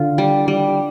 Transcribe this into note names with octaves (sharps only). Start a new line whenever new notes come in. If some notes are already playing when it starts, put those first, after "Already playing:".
Already playing: D3 F4
G3
G3